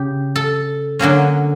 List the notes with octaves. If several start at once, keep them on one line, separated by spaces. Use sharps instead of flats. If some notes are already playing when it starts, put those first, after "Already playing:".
Already playing: C#3 G4
A4
D3 F#3 A#3 C#4